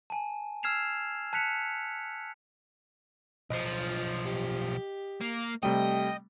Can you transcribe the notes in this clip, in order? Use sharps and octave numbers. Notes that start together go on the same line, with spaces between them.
G#5 A5
E6 F6 G#6 C7 E7 F7
A5 F#6 B6 C#7 F7
B1 F3 D#5
G4
A#3
C3 G3 A3 D#5 G5